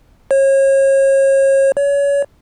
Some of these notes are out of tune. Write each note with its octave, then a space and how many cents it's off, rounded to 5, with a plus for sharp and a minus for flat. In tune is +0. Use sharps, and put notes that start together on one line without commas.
C#5 -35
C#5 +30